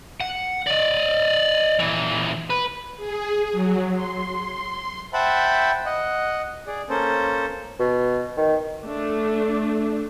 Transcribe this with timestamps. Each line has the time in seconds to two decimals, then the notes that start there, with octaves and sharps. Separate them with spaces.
0.20 F#5
0.67 D5 D#5
1.79 A#2 E3
2.50 B4
2.97 G#4
3.52 F#3
3.92 C6
5.13 C5 E5 F#5 G5 A5 B5
5.86 D#5 F#5
6.67 G#4 D5
6.89 A#3 C#4 A4 C5
7.79 B2
8.37 D#3
8.85 A3 D4